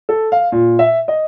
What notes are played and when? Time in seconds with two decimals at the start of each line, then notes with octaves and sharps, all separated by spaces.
0.09 A4
0.32 F5
0.52 A#2
0.79 E5
1.08 D#5